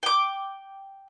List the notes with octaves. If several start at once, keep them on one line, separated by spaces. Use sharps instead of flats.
G5 D6